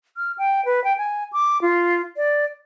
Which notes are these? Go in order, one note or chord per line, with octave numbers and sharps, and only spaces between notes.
F6
G5
B4
G5
G#5
D6
F4
D5